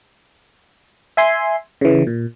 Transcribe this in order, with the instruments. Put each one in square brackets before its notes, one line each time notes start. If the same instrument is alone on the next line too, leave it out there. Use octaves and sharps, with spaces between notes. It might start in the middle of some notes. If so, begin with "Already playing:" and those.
[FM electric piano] E5 G#5 C6
C#3 E3
A#2